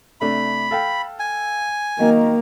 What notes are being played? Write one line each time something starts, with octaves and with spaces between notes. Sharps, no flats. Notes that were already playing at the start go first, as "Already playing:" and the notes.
C3 A3 D4 B5
A4 F5 G5
G#5
D#3 F#3 A#3